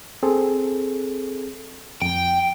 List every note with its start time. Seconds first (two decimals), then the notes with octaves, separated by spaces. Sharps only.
0.23 C4 G#4 A4
2.02 F2 G5